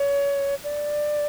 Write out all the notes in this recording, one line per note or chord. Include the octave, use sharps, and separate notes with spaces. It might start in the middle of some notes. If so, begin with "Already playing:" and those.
Already playing: C#5
D5